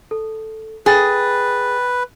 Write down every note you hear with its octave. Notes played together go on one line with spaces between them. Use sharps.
A4
G#4 B4 G5 A6